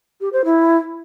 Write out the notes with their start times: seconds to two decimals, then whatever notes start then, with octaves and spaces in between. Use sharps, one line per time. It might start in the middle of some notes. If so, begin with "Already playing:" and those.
0.21 G4
0.33 C5
0.45 E4